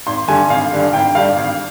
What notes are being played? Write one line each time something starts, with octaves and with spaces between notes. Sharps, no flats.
G#1 C6
G2 D3 G3 G#5
G#1 F5
G2 D3 G3
G#1 G5
G2 D3 G3 F5
G#1